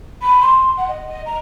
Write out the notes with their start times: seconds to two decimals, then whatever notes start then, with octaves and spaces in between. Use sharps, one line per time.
0.22 B5
0.41 C6
0.77 F#5
0.88 D#5
1.07 D#5
1.26 A#5